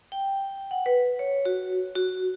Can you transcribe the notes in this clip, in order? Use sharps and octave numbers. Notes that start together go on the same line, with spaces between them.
G5
F#5
B4
C#5
F#4
F#4